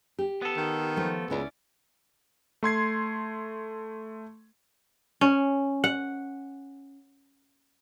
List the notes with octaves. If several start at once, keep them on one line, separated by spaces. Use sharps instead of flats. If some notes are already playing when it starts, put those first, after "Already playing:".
G4
B3 A4
D#3
F3 A3
C#2 C#4 E4 D5
A3 C6 G#6 C7
C#4
F#5